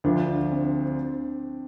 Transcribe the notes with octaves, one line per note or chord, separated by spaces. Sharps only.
D2 D3 F3 D4
C4